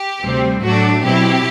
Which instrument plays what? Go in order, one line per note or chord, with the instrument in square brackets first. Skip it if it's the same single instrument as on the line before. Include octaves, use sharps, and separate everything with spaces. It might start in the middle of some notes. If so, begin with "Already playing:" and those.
Already playing: [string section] G4
D2 C3 G3 C4
A2 F#3 A3 D4 F#4
B2 F#3 C4 E4 G4